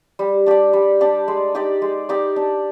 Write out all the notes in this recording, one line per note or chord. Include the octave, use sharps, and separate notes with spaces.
G3
D4 G4 D5
G3
D4 G4 D5
G#3
D#4 G4 D5
G#3
D#4 G4 D5
D4